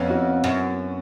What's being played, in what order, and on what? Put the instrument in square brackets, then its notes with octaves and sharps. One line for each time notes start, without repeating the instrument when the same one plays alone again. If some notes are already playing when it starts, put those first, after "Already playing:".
Already playing: [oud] F2 [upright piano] B3 C#4
[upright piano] E4 F#4
[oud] F#2